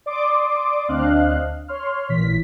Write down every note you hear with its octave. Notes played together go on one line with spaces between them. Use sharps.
D5 C6 D6 D#6
D2 C4 D4 D#5 F5 F#6
C#5 C6 F6
A1 A#2 E3 B6